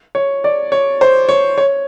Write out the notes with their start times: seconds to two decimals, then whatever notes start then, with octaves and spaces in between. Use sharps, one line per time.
0.15 C#5
0.44 D5
0.72 C#5
1.01 C5
1.29 C#5
1.58 C#5